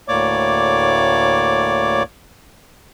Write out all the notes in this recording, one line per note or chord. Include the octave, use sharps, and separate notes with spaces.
D2 A2 A#3 C#5 D5 D6